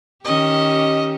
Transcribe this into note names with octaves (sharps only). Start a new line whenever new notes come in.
D#3 C#4 G4 D#5